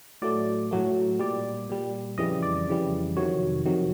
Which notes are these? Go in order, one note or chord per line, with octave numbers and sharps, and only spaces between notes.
A2 F#3 A3 D5
A2 F#3 A3
A#2 G3 D5
A#2 G3
F2 C#3 E3 G3 D#5
D5
F2 C#3 E3 G3
F2 C3 D#3 F#3 C#5
F2 C3 D#3 F#3